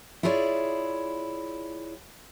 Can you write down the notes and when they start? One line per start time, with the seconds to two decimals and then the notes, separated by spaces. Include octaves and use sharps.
0.23 E4 F4 G#4 A#4 C#5 D5